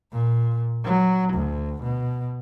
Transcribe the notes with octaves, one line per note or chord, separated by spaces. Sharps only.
A#2
F#3
D2
B2